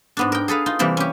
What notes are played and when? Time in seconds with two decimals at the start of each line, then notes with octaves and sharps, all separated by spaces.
0.17 G#2 B3 D4
0.32 A#4 G5
0.48 G#4 A4 B4 F5
0.66 D#4 F4
0.79 C3 E3 G3 A#3 C4
0.97 C#4 G4